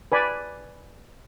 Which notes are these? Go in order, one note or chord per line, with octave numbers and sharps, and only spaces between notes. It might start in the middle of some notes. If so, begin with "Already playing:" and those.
B4 D5 G#5 B5